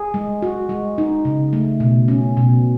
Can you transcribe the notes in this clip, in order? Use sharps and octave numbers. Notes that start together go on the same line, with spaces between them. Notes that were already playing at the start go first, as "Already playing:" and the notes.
Already playing: G#4
G#3
F#4
G#3
D#4
C#3
A3
B2
C#4
B2